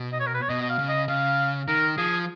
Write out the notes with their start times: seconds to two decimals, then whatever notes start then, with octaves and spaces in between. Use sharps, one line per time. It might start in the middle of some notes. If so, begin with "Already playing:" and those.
Already playing: B2
0.13 D#5
0.20 C#5
0.27 A#4
0.34 B4
0.42 C#5
0.49 B2 D#5
0.62 D#5
0.69 F5
0.79 C#3
0.89 D#5
1.08 C#3 F5
1.68 D#3 A#4
1.97 F3 G#4